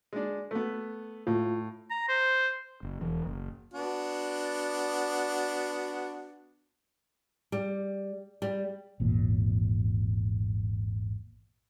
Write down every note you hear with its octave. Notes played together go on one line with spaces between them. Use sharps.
G#3 D4
A3 B3
A2 F4
A#5
C5
F#1
E1 E3
F#1
B3 D4 F#4
G3
G3
G#1 E2 A#2